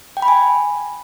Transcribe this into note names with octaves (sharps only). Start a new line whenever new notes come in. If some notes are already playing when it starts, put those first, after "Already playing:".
G5
B5
G#5